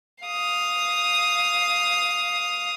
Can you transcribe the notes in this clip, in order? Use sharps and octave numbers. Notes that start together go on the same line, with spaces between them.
F5 D#6